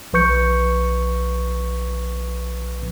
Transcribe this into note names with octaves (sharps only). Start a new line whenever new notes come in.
B1 F3 B4 C#6 G6 C#7